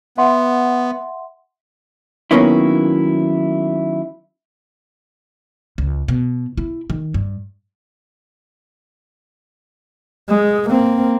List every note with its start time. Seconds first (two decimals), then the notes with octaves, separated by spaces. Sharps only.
0.18 B3 E5 F#5 C6
2.31 D#3 F#3 A#3 B3 C#4 E4
5.78 C#2
6.08 B2
6.57 E4
6.90 D#3
7.14 G2
10.29 G#3
10.69 A#3 C4